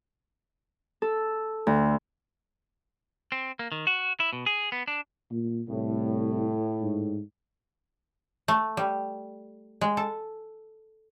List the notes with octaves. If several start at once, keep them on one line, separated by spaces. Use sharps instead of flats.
A4
D2
C4
A#3
D#3
F#4
E4
B2
G#4
B3
D4
A#2
C2 A2
G#2
A3
G3
G#3
A4